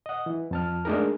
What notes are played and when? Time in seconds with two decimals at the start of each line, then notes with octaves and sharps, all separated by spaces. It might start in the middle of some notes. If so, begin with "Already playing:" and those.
0.06 D#5 F#5
0.26 E3
0.51 F2 A5 F6
0.85 G#3 A3 D4 D#4 G#4 A#4